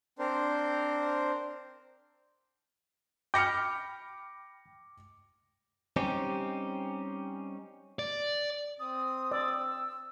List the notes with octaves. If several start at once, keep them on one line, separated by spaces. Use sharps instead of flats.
C4 D4 A#4 C5
G5 B5 D6 F6 A#6 C#7
G3 C4 C#4 D#4 G4
D5
C4 D#6
D5 E6